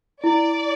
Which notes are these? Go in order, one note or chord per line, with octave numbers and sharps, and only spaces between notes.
E4 D5